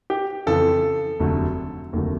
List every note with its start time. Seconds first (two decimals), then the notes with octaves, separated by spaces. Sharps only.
0.10 G4
0.47 F2 C#3 E3 A4
1.19 F1 D#2 D3 F#3 A3
1.93 F1 D#2 D3 F#3 A3 A#4